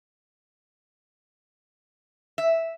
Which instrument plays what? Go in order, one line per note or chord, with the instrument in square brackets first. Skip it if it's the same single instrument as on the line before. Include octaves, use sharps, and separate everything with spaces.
[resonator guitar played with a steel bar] E5